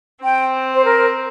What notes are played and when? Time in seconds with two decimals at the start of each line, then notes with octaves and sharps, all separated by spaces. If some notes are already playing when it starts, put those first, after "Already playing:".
0.24 C4 G5
0.75 C5
0.85 A#4